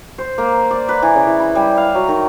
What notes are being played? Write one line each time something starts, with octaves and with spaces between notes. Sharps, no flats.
C5
A#3
D5
B4
E3
C#3
E3
B5
G3
F5
F#3
D#3